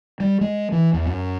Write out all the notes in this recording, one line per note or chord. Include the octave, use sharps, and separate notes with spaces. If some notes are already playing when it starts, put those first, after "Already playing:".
G3
G#3
E3
E2
F#2